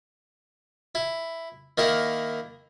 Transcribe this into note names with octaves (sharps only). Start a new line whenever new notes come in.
E4
D#3 A#3 E4 A#4